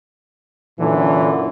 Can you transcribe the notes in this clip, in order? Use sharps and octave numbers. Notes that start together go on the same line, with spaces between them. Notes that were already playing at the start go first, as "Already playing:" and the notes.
F#2 A#2 D3 E3